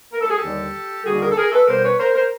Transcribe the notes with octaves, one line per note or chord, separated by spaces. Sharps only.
A#4
A4
G#4
G4 A4
D#2 D3 G3
D#2 D3 G3 F#4 G#4
G#4 A#4
A4
G#4 A#4
A4 B4
B2 G3 B3 A#4 C5
B4 C#5
A#4 C5
A#4 C5